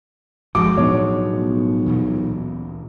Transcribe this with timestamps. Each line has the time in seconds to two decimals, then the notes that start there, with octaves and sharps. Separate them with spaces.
0.55 G1 D3 F3 G#3 F#4 D6
0.77 B1 A2 B3 D4 C#5
1.86 D2 A#2 E3